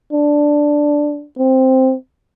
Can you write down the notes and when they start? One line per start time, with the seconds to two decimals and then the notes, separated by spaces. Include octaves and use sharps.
0.12 D4
1.38 C4